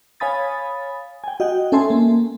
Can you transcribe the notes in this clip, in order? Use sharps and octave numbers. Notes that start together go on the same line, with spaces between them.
C#5 F5 G#5 B5 D#6 A6
G5 G#5
F#4 D#5 F#5 G5
C#4 A4 E5 G#5 A5 C6
A#3